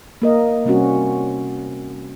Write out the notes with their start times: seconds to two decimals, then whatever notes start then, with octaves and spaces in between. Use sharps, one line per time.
0.22 A#3 A#4 D#5
0.65 C3 G3 C4 C#4 F#4